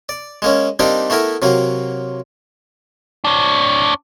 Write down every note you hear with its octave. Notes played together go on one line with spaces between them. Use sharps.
D5
G#3 A#3 C#4
G3 A#3 C4 D4 D#4 G4
A3 B3 E4 A#4
C3 F#3 A#3
D4 C#5